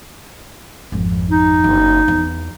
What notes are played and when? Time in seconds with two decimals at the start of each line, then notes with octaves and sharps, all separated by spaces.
0.92 G#1 F2
1.31 D#4
1.64 F#1
2.08 E2